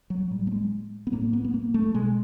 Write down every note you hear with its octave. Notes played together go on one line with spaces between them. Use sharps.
F#3
A2 G3
A3
G#3
B3
A2 A#3
B3
B3
A#3
A3
B2 G#3